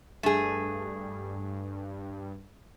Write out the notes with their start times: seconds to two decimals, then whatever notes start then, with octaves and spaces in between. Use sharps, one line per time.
0.23 G2 A3 G#4